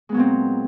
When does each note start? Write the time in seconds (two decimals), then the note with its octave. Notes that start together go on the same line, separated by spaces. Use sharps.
0.09 G#3
0.12 B3
0.14 F#3
0.17 A#2
0.19 C4